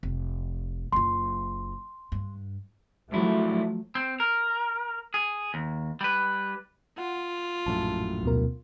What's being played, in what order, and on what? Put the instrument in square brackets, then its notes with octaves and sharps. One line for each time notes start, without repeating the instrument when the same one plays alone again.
[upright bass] F1
[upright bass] F#1 F4 [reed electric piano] C6
[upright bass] G2
[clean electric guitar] C#2 E4 [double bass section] F3 F#3 A3
[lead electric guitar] C4
A#4
G#4
D#2
G3 B4
[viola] F4 [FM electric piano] F#5
[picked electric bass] A#1 F#2 A2 [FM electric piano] A5
[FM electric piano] D2 B2 A#4